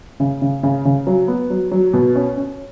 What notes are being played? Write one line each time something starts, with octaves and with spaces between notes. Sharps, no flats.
C#3
C#3
C#3
C#3
F#3
B3
F#3
F#3
B2
C#4
C#4